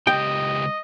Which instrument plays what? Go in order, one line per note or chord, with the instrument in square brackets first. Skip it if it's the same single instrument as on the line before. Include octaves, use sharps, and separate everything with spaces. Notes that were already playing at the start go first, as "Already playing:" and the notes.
[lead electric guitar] C#2 G4 [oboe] D#5 [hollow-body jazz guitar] G5